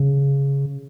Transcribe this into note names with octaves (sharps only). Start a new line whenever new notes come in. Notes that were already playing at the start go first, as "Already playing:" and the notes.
Already playing: C#3